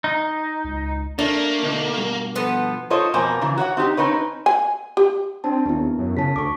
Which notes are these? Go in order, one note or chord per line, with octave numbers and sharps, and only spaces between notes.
D#4
C#2
A3 A#3 D4
D2 B2 D#4
G2 B2
F3 B3 A4
F4 A4 C5 C#5 D#5
F2 B2 A#3 C5 G#5
C#3 E3 A#3
F#4 C#5 D#5 F#5
C4 D#4 G4
C4 C#4 D#4 B4 C#5
G#5
G4
C4 D4 A5
D#2 B3 E4
F#2
C#3 A5 B6
D2 C#6 D6